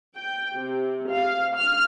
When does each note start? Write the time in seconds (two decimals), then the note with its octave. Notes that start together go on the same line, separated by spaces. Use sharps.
0.15 G5
0.55 C3
1.10 F5
1.57 F6